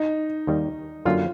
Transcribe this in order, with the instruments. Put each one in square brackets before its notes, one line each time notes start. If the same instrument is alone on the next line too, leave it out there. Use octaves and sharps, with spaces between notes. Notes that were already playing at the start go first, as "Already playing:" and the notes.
Already playing: [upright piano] D#4
[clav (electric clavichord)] D#2 D#3 G3
[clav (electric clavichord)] F#2 D3 F#3 A#3 [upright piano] F4